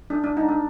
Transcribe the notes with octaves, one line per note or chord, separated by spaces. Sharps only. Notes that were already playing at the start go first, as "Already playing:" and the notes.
D4
D4
D#4
D4